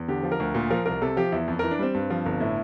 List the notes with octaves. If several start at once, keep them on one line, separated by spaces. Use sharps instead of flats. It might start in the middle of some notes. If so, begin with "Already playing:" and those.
Already playing: E2
D3 G4
F3
A#4
D2
A#2
F3 A#4
C2 A#4
C3 A4
F3 G4
E2 E4
F2
E3 A#4
D4
G3 C4
G2
F3
G1
A2 E4